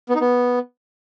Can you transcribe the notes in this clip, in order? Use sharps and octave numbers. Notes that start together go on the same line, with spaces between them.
B3
D#4
B3